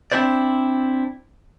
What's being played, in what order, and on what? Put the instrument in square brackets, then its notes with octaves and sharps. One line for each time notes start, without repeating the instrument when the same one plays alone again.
[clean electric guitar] C4 D4 E4 C5 D5